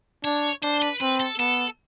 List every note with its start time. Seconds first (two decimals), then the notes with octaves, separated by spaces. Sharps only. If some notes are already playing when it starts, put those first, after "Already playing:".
0.24 D4 C#5
0.63 D4 C5
0.82 B4
1.01 C4 B4
1.20 A4
1.39 B3 A4